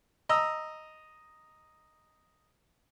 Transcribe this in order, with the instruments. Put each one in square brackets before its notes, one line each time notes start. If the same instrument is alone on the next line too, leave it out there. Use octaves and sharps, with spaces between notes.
[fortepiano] D#5 A#5 E6